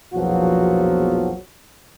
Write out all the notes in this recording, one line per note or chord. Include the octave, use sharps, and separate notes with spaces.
A#1 E2 B2 F3 F#3 F#4